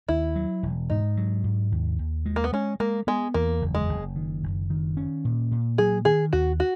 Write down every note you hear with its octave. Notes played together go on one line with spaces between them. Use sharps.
D#2 E4
F#3
E1
G#2 D#4
F#3
G#2
D#2
D#2
G#3
A#3
B3
G#3 C#4
G#3 A#3
G#3 B3
E2 A#3
F#1
G#3
F#1
D#3
F#1
D#3
C#4
A#2
A#2
F#3 G#4
D#3 G#4
D#2 F#4
F#4